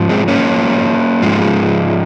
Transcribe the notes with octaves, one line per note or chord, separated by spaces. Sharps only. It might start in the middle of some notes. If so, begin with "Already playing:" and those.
Already playing: G#2 F3
G#3 C4
A#3 C#4
G#2 F3 G#3